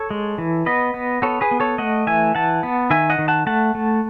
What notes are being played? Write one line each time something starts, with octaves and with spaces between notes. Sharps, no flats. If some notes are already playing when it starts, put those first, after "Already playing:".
Already playing: A4 C#5
G#3
E3
B3 B4 D#5
B3
B3 A4 C#5
G#4 B4
B3
A4 C#5
A3 D#5 F#5
E3 E5 G#5
E3 F#5 A5
B3
D#3 E5 G#5
D#5 F#5
D#3
F#5 A5
A3 F#5 A5
A3